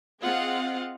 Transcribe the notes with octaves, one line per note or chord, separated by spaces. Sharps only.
C4 F4 G#4 D#5 F5 F#5